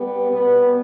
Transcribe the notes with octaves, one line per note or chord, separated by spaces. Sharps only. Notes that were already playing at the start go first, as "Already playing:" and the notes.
Already playing: G3 B3
B2 G3 B3